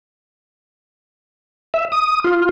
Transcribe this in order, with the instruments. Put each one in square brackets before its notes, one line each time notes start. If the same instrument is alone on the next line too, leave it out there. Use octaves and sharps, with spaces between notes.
[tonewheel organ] E5
D#6
F4